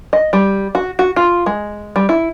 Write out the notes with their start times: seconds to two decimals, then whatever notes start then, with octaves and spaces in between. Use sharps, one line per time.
0.13 D#5
0.33 G3
0.75 F#4
0.99 F#4
1.16 F4
1.46 G#3
1.96 G3
2.09 E4